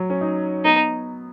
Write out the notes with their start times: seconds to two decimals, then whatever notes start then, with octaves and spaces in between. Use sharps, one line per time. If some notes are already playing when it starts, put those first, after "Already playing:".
Already playing: F#3
0.10 C#4
0.21 D#4
0.64 B3 D#4